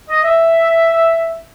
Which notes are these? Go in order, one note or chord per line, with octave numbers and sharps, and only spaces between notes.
D#5
E5